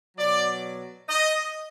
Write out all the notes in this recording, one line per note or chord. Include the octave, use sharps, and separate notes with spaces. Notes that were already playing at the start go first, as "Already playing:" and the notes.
B2 F#3 D5
D#5